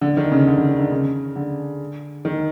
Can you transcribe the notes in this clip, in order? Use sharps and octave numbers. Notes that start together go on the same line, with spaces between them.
D3
D#3
C#3
D3
D3
D#3
D3
C#3
D3
D#3